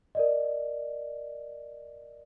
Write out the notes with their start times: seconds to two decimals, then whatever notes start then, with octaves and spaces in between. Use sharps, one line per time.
0.15 A#4 D5 D#5